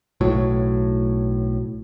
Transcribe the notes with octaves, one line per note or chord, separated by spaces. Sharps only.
B1 A2 F#3